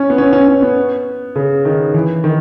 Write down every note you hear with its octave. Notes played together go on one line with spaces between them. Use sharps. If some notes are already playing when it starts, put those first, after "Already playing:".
Already playing: C#4
B3
C#4
C#4
C#4
B3
C#3
D#3
E3
D#3